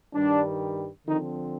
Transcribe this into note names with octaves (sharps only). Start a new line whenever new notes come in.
G2 D#3 G3 D4
D3 D#3 F3 C4 D#4